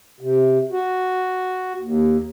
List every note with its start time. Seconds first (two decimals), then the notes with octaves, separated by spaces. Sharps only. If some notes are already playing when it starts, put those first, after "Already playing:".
0.21 C3
0.72 F#4
1.81 D#2